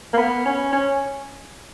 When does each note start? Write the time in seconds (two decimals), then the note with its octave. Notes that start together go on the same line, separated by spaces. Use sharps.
0.13 A#3
0.18 B3
0.46 C#4
0.73 C#4